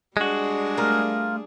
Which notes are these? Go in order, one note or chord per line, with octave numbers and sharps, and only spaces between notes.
G3 G#3 D4 F#4 G#4
A3 F4 A#4